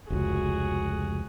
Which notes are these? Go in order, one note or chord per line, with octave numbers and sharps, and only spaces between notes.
F1 C#2 F#4 G#4